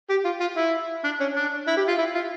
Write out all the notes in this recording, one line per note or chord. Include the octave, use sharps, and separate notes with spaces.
G4
F4
F4
E4
D4
C#4
D4
E4
G4
F4
E4
F4